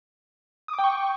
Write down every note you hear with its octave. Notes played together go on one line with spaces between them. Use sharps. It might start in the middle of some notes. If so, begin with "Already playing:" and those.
D#6
D6
G5
C#6